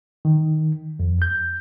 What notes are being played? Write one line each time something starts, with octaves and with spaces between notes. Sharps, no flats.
D#3
F2
G6